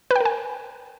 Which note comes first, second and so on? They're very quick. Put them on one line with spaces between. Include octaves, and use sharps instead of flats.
B4 G5 A#4 G#5